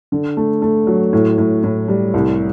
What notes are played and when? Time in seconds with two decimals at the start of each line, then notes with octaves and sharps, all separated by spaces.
0.12 D3
0.37 A3
0.62 A3
0.87 F#3
1.13 A2
1.38 A2
1.64 A2
1.88 G3
2.14 C2